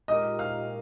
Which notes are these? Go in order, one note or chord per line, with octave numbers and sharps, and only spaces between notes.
A#2 G#3 D#4 G4 A#4 D#5 D#6
F5 F6